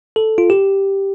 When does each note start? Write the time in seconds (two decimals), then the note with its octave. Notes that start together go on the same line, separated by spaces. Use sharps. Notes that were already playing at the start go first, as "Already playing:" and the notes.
0.16 A4
0.38 F4
0.50 G4